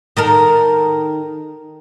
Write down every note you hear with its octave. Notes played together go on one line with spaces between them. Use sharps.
D#3 A4 A#4